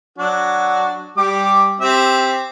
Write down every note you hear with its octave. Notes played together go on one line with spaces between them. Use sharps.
F#3 D4 F#4
G3 G4 D6
C4 G4 E5